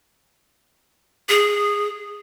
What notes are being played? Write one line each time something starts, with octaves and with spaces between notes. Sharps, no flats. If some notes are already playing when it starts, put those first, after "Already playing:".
G#4